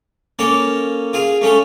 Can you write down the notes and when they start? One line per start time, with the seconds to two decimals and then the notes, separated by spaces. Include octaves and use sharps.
0.39 A#3 C#4 A4 A5
1.13 F4 G#4 F5
1.41 A3 C#4 A4